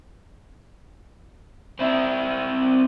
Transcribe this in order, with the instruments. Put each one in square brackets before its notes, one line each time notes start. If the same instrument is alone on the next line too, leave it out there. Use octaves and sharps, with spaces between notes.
[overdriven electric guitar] C4 E4